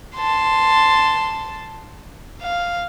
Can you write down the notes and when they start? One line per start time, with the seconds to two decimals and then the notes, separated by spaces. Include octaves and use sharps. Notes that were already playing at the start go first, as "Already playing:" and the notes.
0.16 A5 C6
2.42 F5